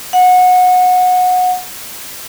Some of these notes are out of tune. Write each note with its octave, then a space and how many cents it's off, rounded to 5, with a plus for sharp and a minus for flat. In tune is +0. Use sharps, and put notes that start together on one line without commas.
F#5 -20